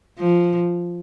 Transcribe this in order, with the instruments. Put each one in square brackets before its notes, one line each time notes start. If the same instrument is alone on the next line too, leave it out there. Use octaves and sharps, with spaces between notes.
[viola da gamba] F3